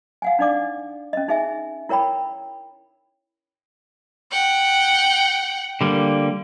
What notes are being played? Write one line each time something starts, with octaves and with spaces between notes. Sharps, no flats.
F5 F#5 G#5
D4 D#4 D5 D6
C#4 D#5
D#4 G#4 E5 G#5
E4 A#4 C#5 G5 B5
F#5 G5
D3 G3 A#3